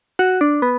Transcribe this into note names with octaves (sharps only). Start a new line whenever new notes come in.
F#4
D4
B3